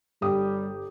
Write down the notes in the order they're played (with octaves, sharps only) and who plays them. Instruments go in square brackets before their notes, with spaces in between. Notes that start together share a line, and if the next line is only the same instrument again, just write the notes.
[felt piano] G1 G4 D#6 [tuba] G3